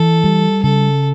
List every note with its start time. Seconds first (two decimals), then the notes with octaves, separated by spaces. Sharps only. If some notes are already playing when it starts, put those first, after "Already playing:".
Already playing: E3 A4
0.24 G3
0.63 C#3 A4